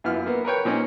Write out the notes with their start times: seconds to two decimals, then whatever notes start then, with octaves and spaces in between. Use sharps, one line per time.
0.04 F#2 B3 E4 F4 F6
0.26 A#3 B3
0.45 A#4 B4 C#5 G5
0.65 A#2 C4 C#4 D#4